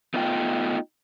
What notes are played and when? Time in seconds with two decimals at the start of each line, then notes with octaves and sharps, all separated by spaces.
0.14 A3 B3 D#4 F4 G5